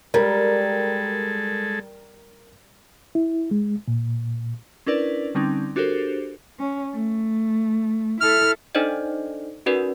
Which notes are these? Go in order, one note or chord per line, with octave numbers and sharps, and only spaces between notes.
G3 G#3 A4 A#4
E4
G#3
A#2
C#4 D4 E4 A#4 B4 D5
D3 G3 C4 C#4 D#4
D4 F#4 G4 A4 A#4 C5
C#4
A3
E4 A4 F6
D4 D#4 A4 C5 D5 D#5
C#4 D#4 F#4 A#4 B4 D5